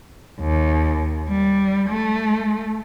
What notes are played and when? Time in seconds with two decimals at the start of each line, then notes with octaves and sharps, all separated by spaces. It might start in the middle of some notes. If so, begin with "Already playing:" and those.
0.40 D#2
1.29 G3
1.90 A3